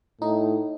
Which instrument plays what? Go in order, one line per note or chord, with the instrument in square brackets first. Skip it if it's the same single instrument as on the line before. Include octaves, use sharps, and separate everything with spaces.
[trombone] A2 [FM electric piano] D#4